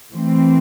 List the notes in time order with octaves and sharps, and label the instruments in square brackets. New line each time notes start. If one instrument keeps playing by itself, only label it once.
[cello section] E3 A3 C4